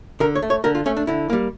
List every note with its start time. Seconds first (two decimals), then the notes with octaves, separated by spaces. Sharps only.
0.20 D3 A#4
0.35 C#5
0.42 A3
0.50 C#5
0.64 D3 A#4
0.75 F4
0.86 A3 C#4
0.97 D4
1.07 D3 E4
1.30 G3 A#3